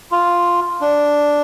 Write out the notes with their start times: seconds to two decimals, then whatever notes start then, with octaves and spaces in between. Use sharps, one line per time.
0.11 F4
0.81 D4